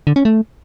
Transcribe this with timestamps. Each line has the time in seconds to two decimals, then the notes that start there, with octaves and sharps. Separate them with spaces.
0.07 D3
0.16 C#4
0.25 A3